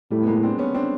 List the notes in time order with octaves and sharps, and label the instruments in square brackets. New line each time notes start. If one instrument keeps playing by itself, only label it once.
[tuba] A2 [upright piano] G3 A3
[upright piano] B3
G#3 A#3
C4 D4
B3 C#4
C4 D4